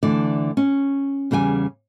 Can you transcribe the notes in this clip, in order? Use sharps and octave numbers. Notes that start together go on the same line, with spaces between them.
D2 D3 E3 D5
C#4
E2 C#3 G3 G5 G#5